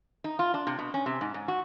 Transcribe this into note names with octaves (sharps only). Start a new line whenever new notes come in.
D#4
F4
D4
C3
B2
C#4
C3
G#2
G#2
F#4